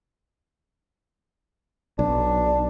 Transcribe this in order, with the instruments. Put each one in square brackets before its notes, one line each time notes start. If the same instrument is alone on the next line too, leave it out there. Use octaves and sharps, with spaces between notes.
[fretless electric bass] B1 [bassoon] D4